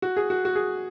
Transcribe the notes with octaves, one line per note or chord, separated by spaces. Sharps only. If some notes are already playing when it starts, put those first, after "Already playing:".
F#4
G#4
F#4
F#4
G#4